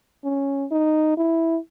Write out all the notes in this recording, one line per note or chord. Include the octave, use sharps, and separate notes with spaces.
C#4
D#4
E4